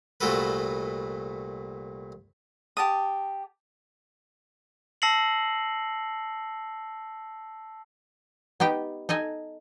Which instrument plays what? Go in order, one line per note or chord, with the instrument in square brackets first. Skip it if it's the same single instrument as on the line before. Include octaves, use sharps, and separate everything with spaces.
[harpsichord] C2 A#2 A3 F#4 A4 B4
[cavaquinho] G4 A5 D#6
[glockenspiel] A5 E6 A#6 C7 C#7 F#7
[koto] B3 D#4 G4 G5
D#4 A4 D#5 G#5